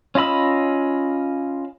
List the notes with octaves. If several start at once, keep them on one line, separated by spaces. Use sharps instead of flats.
C#4 F4 D#5 B5 E6